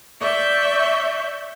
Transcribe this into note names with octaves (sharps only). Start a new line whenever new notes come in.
D5 E5 C#6 G6